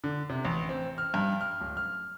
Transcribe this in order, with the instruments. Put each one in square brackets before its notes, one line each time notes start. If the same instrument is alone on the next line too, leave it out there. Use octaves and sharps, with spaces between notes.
[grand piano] D3
C3
A1
C4
F6
G2
F6
D1
F6